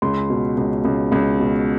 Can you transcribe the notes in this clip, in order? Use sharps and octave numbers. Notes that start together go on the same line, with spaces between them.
C#2 C6
B2
C#2
C#2
C#2
B2